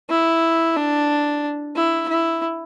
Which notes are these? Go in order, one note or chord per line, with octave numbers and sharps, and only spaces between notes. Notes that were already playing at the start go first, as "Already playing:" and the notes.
E4
D4
E4
E4